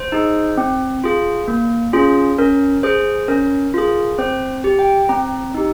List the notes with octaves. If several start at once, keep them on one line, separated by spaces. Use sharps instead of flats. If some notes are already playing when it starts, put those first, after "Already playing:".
Already playing: C5
D#4 G#4
C4
F4 G#4
A#3
C#4 F4 G#4
C#4 A#4
G#4 C5
C#4 A#4
F4 G#4
C4 C5
G4
G5
C4 A#5
D#4 G4